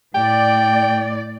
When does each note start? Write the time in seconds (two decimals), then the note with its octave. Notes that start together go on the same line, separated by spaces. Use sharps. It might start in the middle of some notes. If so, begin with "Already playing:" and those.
0.15 A2 D5 G5